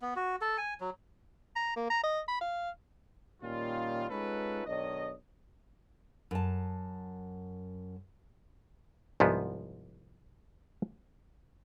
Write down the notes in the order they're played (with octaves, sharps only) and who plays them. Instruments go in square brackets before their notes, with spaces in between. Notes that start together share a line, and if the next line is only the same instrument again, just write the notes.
[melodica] B3
F#4
A4
G#5
F#3
[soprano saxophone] A#5
A#3
A#5
D#5
B5
F5
[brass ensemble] A#2 D#3 G3 C#4 F4
G#3 C#4 D#4 F4 A4 B4
B1 D#3 D4 C#5 D#5
[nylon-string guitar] F#2 A5
[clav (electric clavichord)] C2 G#2 F3 B3